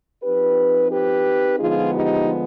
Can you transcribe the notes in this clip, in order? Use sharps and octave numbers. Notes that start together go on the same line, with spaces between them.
F3 C4 D#4 G4 B4
G4 B4
D3 F3 G#3 B3 D#4 F4 G#4
D#4 G4